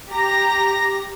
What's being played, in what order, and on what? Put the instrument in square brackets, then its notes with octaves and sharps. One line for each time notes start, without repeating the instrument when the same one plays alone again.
[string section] G4 A#5 A#6